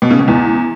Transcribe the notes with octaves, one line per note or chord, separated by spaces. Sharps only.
B2
C#3
B2
E2